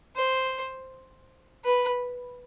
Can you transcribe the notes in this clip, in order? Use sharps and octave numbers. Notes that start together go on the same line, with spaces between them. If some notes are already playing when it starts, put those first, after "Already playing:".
C5
B4